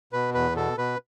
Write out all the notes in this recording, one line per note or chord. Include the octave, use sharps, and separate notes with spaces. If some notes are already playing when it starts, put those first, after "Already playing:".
B2 B4
E2 B4
B2 A4
B2 B4